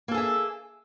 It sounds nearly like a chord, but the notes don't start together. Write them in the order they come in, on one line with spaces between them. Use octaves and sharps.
A#3 A4 G#4 E5